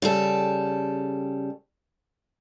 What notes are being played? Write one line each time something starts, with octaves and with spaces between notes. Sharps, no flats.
C#3 G3 A4